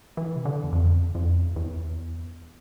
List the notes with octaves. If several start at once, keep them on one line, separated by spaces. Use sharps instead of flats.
E3
C3
D3
E2
F2
F2
E2